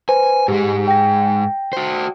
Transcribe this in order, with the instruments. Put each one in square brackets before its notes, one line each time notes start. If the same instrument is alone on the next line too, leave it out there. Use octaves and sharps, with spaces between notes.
[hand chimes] B4 C5 [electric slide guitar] G#5
[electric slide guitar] G#2 G#3 [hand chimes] G4
[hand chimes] G5 A#6
[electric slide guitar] F#4 C5